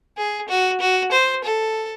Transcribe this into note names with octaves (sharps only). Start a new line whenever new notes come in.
G#4
F#4
F#4
C5
A4